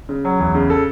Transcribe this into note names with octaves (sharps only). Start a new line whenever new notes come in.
C#3
F#3
E2
C#3
A4